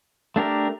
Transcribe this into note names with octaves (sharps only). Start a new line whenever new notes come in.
A3 D4 G4 A#4